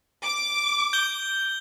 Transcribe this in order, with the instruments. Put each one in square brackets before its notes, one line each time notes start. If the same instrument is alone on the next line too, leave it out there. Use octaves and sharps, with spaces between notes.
[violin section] D6
[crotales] G6 G7